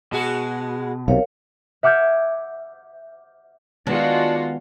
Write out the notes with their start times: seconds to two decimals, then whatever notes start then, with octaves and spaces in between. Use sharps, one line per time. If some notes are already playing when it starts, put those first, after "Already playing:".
0.12 B2 G#3 F#4 G#4
1.08 B1 C3 A#4 C#5 F5
1.83 E5 F#5 D6 F6 G6 G#6
3.87 D#3 G#3 B3 D4 F4 F#4